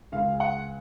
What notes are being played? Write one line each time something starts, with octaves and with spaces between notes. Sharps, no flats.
C#2 C#3 G#3 F5
F#5